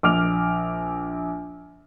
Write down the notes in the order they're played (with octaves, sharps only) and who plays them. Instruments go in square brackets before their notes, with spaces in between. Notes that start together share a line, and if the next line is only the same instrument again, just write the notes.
[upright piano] A#1 D6 F6 F7